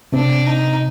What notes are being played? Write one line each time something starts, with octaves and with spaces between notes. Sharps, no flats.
C3 C4 D4
D#4